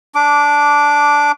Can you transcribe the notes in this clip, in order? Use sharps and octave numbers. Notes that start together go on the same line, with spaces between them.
D4 D6